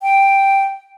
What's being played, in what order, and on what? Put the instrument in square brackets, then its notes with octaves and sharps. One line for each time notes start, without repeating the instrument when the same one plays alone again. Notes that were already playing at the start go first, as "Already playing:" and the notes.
[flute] G5